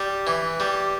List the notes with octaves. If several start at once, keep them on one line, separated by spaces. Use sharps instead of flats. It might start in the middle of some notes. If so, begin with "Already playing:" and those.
Already playing: G3
E3
G3